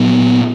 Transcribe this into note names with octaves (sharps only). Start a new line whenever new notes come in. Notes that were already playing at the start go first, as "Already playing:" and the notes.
Already playing: A#2 F#3 B3